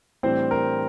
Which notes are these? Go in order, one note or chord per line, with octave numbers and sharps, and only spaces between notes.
A2 E3 G3 C4 D4 C5
A#4